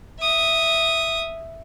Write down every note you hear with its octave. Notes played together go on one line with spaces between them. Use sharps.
E5 D#6